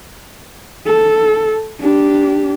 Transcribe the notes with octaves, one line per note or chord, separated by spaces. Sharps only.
A4
D4 G4